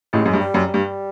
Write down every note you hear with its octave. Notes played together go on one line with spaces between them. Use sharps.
A1 A2 G#3
F#2
G2
G3
F#2
G3
G2